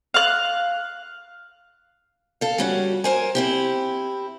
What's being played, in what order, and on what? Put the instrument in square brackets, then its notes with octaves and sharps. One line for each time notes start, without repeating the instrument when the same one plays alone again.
[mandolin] F5 F#6
[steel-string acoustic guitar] A4 F5
G3 C#4 F#4
A#4 C5 G#5
C4 E4 G4